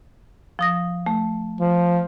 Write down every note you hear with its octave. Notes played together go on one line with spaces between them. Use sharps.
F3 D#6 A#6
A3
F3